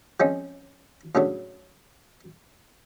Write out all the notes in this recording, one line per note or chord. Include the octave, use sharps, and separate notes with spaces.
F3 G#3 C4 C#4 D#4
A2 C#3 F#3 A3 D4